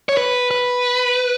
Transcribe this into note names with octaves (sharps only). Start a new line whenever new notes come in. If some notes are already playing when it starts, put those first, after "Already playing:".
C#5
B4
B4